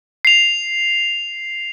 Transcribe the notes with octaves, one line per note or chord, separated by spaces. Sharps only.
C7 F7